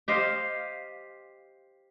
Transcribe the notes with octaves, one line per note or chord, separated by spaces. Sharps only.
G4 C5 D#5 F5